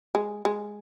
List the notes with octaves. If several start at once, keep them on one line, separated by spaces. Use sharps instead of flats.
G#3
G#3